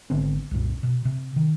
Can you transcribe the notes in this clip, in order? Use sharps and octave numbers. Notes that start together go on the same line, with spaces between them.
G#1 D3 B3 C4
C2 F#2 A#2
B2
C3
D#3